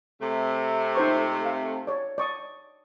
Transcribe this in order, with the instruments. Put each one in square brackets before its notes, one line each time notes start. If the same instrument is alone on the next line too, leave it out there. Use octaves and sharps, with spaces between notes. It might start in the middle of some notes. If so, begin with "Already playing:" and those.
[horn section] C3 A3
[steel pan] D#4 C5 C#6
F5
C#5 D5
D5 C#6 D#6